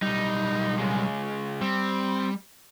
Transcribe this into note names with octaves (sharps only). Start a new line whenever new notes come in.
B1 G3 D#4
C#3 G#3
G3 C4